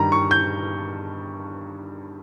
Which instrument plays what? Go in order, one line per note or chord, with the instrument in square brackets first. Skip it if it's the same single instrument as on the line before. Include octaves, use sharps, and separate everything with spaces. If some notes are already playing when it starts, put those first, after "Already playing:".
Already playing: [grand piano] G2 D#3 G3 A#5
C#6
G6